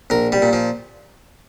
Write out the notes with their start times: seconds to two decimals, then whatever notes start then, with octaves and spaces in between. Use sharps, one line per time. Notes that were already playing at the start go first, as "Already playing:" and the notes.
0.10 A#1 A#4
0.32 G3
0.42 A#2
0.53 F3